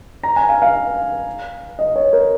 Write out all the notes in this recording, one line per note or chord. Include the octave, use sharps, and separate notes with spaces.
A#5
G#5
F5
F5
D#5
C#5
A#4